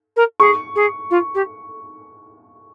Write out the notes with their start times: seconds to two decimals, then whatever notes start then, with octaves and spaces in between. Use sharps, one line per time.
0.17 A#4
0.40 G#4 C#6
0.76 G#4
1.11 F4
1.35 G4